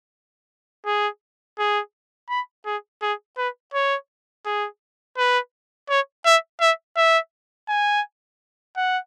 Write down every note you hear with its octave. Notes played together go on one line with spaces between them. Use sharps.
G#4
G#4
B5
G#4
G#4
B4
C#5
G#4
B4
C#5
E5
E5
E5
G#5
F#5